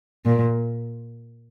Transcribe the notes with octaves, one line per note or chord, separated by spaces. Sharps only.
A#2